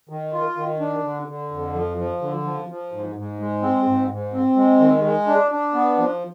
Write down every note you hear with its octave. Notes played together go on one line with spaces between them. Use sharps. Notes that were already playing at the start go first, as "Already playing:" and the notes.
D#3
F4
D#3
D4
D3
D3
F2
F3
F3
D3
F3
F3
G#2
G#2
G#3
C4
G#2
G#2
C4
G#3
D#3
G#3
D4
D4
B3
F3